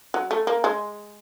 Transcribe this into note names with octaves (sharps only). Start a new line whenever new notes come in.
F#3
A3
A#3
G#3